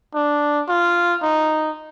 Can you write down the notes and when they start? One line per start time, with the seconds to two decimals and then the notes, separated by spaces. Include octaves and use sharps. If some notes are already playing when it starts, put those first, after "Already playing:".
0.14 D4
0.69 F4
1.22 D#4